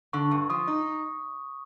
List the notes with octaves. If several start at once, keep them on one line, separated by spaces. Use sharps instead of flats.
D3 C#6
G2
F3 D#6
D#4